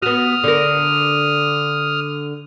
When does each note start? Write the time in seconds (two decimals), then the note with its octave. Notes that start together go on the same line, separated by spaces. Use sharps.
0.02 B3 F#4 D#6 F6
0.44 D3 A#4